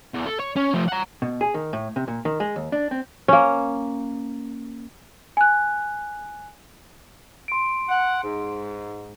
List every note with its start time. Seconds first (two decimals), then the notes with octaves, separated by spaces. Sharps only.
0.14 E2
0.26 A4
0.39 C#5
0.56 C#4
0.73 F3 A3
0.88 F#5 A#5
1.22 B2
1.41 G#4
1.54 D#3
1.73 A2
1.96 C3
2.08 A#2
2.25 D#3
2.40 G#3
2.56 D#2
2.72 D4
2.91 C4
3.28 A#3 C#4
5.37 G#5 F#6
7.48 C6 D7
7.89 F#5
8.22 G#2